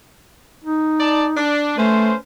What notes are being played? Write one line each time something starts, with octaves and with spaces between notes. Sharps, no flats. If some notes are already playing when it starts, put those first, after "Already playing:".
D#4
D5 A5
D4
A3 C#4 B4 C5